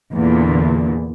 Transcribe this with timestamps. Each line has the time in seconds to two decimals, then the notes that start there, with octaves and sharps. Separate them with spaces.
0.12 E2 A#2 D3